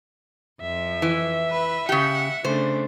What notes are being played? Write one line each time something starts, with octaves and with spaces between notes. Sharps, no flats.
F2 F3 E5
E3
B4
C#3 G4 F#5
C#3 A3 D4 C5